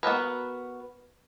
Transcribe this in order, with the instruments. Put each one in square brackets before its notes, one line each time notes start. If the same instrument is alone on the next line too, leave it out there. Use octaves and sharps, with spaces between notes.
[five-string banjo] B3 F#4 A#4 B4